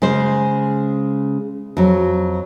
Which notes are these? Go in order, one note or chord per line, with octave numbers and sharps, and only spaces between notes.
C#3 G#3 C5
F2 F#3